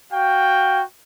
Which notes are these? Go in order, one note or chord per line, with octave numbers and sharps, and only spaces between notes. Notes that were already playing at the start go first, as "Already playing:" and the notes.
F#4 F5 G5